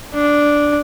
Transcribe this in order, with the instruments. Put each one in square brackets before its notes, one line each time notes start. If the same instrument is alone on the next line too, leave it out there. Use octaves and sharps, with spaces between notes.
[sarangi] D4